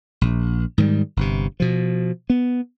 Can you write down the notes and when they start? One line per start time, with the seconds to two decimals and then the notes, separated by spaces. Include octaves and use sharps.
0.21 A#1
0.78 G#2 D#3 F3 G3
1.17 G1 C3
1.60 B2 F3
2.30 B3